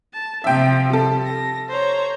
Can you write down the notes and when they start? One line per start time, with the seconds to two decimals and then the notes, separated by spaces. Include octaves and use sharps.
0.13 A5
0.44 C3 F3 E5 G5
0.90 G3 A4
1.25 A#6
1.69 C5 C#5 A#5